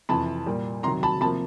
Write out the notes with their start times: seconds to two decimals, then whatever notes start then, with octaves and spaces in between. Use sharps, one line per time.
0.09 F2 C3 E3 A5 B5
0.46 A#2 G3 A#3
0.83 C3 D#3 F#3 A#5 C6
1.03 A5 B5
1.21 C3 F3 A#3 A5 B5